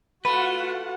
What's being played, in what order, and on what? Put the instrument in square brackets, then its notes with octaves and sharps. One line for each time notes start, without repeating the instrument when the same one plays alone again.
[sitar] A3 [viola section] F4 F#4 F#5 [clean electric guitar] B4 [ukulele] B5